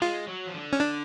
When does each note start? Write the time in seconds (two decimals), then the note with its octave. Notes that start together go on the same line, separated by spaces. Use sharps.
0.01 G#3 F4
0.27 F#3
0.47 F3
0.54 D3
0.73 C#4
0.80 D4